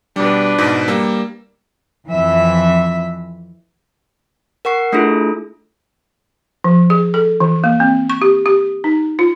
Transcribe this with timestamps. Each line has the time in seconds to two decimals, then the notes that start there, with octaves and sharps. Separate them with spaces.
0.16 B2 G3 D4 B4
0.58 G#2 B2
0.88 G3 A#3 E6
2.08 F2 E3 E5
4.65 A#4 F#5 C#6 C7
4.92 A3 D4 E4 F4 G#4 A4
6.64 F3
6.90 G#4
7.14 A4
7.40 E3
7.64 A#3
7.80 C4
8.10 C#6
8.22 G4
8.46 G4
8.84 D#4
9.19 F4